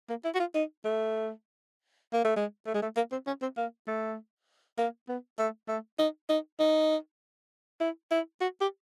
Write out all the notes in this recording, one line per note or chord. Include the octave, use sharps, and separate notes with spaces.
A#3
E4
F#4
F4
D#4
A3
A#3
A3
G#3
A3
G#3
A3
A#3
C4
C#4
C4
A#3
A3
A#3
B3
A3
A3
D#4
D#4
D#4
E4
E4
F#4
G4